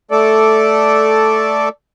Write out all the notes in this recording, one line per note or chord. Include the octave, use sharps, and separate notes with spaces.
A3 A4 D5